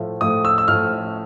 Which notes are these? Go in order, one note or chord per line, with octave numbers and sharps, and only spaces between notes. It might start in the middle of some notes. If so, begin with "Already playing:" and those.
Already playing: A2 F3 A3
A2 F3 A3 D#6
E6
E6
A2 F3 A3 F6